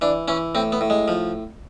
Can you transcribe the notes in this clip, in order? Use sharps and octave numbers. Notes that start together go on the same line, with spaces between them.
E3 D4
E3 C#4
A2 C4
B3
A2
G#3
F3